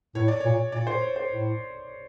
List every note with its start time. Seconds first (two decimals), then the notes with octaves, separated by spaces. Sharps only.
0.15 A2 C#5
0.28 D5
0.40 A#2 C#5
0.72 A#2 D5
0.87 C5
1.01 C#5
1.16 C5
1.31 A2